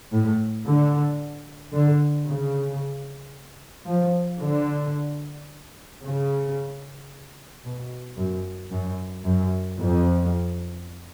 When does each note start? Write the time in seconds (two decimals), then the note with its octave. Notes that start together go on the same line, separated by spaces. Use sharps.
0.12 A2
0.66 D3
1.73 D3
2.26 C#3
3.87 F3
4.41 D3
6.02 C#3
7.64 B2
8.17 F#2
8.71 F#2
9.25 F#2
9.79 F2